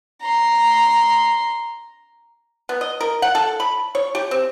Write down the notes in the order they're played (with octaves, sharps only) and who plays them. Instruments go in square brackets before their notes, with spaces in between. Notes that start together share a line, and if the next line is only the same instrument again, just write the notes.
[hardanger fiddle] A#5 C6
[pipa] B3
D#5
A#4
F#5
A4
B5
C#5
G4
C4